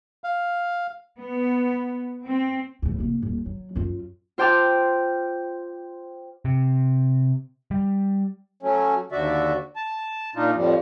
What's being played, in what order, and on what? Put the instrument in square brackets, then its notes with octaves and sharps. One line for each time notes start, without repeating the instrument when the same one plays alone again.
[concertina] F5
[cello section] B3
C4
[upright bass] E2 A2
F1 A#3
D#1 A2
F#3
F#2 F4
[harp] F4 C5 G5 A5 D6 F6
[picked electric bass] C3
G3
[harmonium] F#3 A3 C#4
D#2 D3 F#4 D5 E5
A5
A#2 D4 D#4 F4
F2 A2 F3 G3